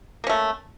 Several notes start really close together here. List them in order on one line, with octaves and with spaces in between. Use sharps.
A#3 C#4 A3